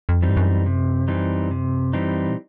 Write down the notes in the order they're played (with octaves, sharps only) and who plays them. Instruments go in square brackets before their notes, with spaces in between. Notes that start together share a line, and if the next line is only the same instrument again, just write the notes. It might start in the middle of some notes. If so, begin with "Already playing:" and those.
[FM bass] F2
[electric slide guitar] E3 G3 C4 D#4
[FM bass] G2
F#2
[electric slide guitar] C3
E3 G3 C4 D#4
C3
E3 G3 C4 D#4
[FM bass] A#2